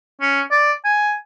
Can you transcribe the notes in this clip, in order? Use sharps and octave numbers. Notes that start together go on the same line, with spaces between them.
C#4
D5
G#5